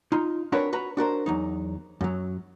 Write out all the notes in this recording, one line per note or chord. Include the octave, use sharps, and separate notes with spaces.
D#4 F4
C4 D4 F#4 A#4 B4 C#5
F#4 B4 A#5
D4 F#4 A#4 C5
E2 F#3 D#4
F#2 F#3